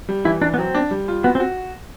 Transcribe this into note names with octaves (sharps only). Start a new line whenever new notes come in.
G3
E3 E4
E3 D4
B3
F#3 C4
D4
G3
F4
B3 F#4
C4
F#4